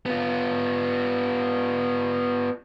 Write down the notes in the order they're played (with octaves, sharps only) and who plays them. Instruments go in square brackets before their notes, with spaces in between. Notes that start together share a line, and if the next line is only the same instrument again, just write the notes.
[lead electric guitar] B3 F4